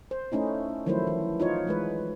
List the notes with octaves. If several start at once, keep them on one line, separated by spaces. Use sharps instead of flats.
C5
A3 C#4 D#4 E4
D#3 F3 F#3 A3 E4 C5
E3
D#4 F4 C#5
E3 G#3 B4